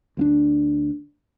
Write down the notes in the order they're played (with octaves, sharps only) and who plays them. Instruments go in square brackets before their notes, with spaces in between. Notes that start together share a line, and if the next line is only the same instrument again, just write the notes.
[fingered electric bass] D2 A#3 D4